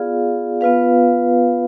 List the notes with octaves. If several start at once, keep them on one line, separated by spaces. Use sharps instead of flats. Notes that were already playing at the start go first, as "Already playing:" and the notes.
Already playing: B3 F4 G#4 D5 F5
B3 F4 B4 F5